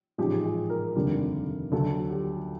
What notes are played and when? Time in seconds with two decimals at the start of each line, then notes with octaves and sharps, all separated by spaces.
0.18 A1 G#2 F3 G#3 G4
0.44 G#4
0.70 A#4
0.96 F1 D#2 D3 G3
1.72 D2 D3 F#3 A4
2.10 G4